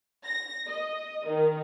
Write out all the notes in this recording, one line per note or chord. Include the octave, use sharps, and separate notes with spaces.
A#6
D#5
D#3